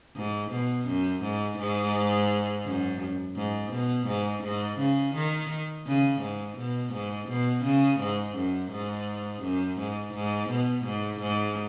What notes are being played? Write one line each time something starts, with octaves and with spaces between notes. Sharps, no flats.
G#2
B2
F#2
G#2
G#2
F#2
G#2
B2
G#2
G#2
C#3
D#3
C#3
G#2
B2
G#2
B2
C#3
G#2
F#2
G#2
F#2
G#2
G#2
B2
G#2
G#2